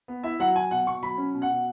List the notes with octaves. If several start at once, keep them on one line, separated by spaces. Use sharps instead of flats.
B3
E4 E5
F#3 F#5
F#3 G#5
B2 F#5
B2 C#6
F#3 B5
C#4
B2
F#5
B2